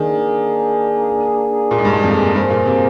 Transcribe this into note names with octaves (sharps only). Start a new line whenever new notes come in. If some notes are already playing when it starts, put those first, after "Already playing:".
Already playing: D#3 A#3 D4 G#4
A#2
G#2
G2
G#2
F2
G2 A#3 F4 G#4 C5
A#2
C3